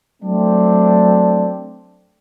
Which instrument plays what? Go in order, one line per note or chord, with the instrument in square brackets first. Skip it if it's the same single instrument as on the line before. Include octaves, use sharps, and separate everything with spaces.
[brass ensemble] F#3 A3 C4 D4